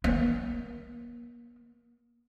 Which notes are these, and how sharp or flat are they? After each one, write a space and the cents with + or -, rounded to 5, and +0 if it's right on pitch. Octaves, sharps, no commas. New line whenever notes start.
A#3 +40